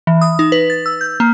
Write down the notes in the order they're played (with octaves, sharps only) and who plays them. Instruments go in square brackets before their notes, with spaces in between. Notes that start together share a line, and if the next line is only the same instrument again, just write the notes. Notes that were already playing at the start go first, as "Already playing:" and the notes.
[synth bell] E3
D#6
D#4
B4
A6
E6
G6
A#3